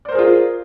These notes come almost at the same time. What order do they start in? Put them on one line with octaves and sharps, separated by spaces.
D5 C5 A#4 G#4 F4